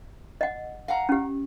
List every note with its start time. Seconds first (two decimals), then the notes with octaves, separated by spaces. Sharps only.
0.41 D#5 F#5
0.88 F5 F#5 A#5
1.09 C#4 G4